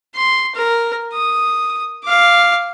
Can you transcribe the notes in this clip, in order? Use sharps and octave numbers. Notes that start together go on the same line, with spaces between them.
C6
A#4
D#6
F5 D6